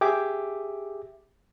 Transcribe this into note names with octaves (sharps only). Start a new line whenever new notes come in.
G4 G#4 E5 D6